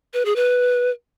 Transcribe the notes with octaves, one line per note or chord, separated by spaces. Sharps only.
B4
G#4
B4